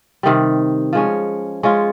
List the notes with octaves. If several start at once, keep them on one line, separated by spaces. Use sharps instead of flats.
C3 D#3 G3
F3 G#3 C#4
G#3 C#4 F4